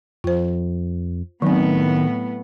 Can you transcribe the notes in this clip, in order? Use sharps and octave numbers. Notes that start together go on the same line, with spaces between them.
F2 F4 C5
A2 D#3 F#3 B3 C4